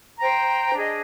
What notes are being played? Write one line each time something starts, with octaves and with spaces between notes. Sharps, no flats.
C5 G5 A#5
D4 G#4 D#5